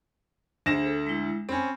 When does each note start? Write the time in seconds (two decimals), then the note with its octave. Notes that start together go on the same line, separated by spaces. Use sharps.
0.66 D2 G#4 C5 A#6 E7
0.86 A4
1.07 G#3 E4
1.49 C4 C#4 B5